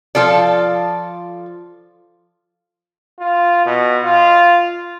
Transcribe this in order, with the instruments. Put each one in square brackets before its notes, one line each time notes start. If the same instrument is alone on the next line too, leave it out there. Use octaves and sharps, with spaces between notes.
[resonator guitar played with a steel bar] F3 F4 A4 D5
[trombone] F4
B2
F4